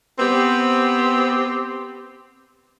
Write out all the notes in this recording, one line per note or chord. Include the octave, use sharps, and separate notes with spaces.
B3 C4 G4